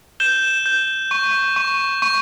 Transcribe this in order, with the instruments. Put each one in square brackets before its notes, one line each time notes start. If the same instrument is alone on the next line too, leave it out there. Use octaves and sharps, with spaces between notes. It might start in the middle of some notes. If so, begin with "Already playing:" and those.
[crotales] G6 E7 G7
G6
C#6
C#6
C#6